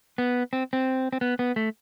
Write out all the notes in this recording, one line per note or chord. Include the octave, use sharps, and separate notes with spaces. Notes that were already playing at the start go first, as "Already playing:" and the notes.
B3
C4
C4
C4
B3
B3
A3